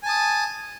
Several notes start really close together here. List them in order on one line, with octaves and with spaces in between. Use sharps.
G#5 A5 D#6